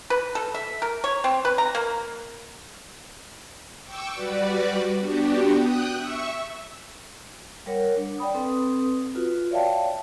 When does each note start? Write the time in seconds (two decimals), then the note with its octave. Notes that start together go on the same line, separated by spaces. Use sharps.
0.10 B4
0.35 A4
0.54 E5
0.82 A#4
1.04 C#5
1.24 C4
1.45 B4
1.58 A#5
1.75 A#3
3.84 G5 C#6 D6 E6
4.13 G3 F#4 B4 D5
4.99 B3 D4 F#4 G4
5.54 G5 D#6 F#6
5.94 E5 C#6 E6
7.66 G3 A#4 C#5 F#5
7.97 D4
8.18 D5 G5 B5 D#6
8.35 C4 A4 B4 D#6
9.15 F4 F#4 B4
9.51 C#5 D5 E5 F5 G5 A5